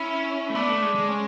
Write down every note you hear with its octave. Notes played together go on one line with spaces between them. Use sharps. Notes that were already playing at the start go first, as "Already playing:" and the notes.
Already playing: C#4 E4
A3
B3 D4
A3
G#3
G#3
C#4